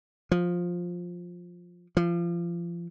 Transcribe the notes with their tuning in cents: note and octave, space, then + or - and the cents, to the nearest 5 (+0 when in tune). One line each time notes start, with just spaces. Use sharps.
F3 +10
F3 -30